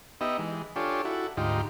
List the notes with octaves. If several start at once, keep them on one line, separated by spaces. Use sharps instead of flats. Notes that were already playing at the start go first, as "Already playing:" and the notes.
B3 D#4 G4 D#5 E5
E3 G#3
D4 F4 G4 A4 C#5 G#5
E4 F#4 A4
D2 G#2 D#4 F4 G4